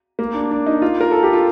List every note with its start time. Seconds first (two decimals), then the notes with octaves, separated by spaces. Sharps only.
0.19 A#3
0.34 D4
0.51 D4
0.66 D#4
0.82 F4
1.01 A#4
1.11 A4
1.23 G4
1.33 F4